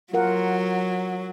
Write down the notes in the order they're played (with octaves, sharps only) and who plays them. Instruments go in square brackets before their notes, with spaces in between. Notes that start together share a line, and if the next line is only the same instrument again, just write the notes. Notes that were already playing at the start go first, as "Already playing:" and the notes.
[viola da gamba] F#3 [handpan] F4 A#4 F#5